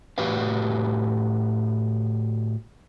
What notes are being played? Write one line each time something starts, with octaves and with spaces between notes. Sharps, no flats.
A2 F#4 G4 B4 F5